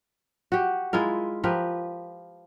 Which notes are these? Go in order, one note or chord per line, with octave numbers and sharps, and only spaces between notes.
F#4 G4
G#3 E4 F4 A#4
F3 G4 A#4 B4